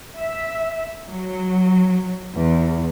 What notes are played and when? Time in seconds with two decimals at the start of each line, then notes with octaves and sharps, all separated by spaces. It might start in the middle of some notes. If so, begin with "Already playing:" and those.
0.17 E5
1.09 F#3
2.35 E2